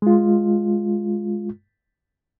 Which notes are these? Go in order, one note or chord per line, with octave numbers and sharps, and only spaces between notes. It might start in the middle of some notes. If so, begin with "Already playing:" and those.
G#3 F4